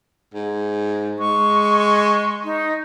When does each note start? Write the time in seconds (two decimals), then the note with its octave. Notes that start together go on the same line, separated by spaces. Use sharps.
0.34 G#2
1.19 G#3 C#6
2.44 D#4